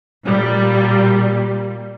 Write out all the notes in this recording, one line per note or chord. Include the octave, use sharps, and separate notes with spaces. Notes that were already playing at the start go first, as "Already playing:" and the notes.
A#2 G3